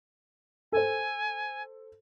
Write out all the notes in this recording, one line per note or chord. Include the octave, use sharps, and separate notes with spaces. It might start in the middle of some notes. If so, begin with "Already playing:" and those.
A4 C5 G#5